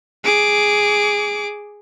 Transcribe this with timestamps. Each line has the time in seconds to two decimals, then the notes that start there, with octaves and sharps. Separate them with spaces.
0.24 G#4 D6